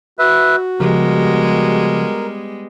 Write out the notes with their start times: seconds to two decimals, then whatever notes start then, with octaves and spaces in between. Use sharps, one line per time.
0.19 F#4 B4 E5
0.80 C#3 F3 G3 G#3 B3 G4 A#4